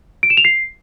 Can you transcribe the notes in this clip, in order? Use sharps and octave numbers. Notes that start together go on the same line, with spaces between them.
D7
E7
F7
C7